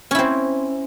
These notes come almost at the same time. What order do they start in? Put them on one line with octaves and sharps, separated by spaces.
C#4 E4 C4